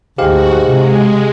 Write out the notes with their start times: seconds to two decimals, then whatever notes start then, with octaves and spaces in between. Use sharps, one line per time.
0.18 D2 G#2 F#4 G4 F5
0.67 C3 G#3